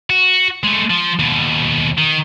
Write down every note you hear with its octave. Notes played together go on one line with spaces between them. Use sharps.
F#4
G#3 A3
F3
D#2 B2
D#3